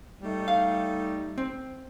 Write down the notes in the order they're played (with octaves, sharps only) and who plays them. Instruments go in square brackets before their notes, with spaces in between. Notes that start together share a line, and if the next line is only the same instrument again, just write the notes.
[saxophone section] G3 A3 D#4
[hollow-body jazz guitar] F5
C4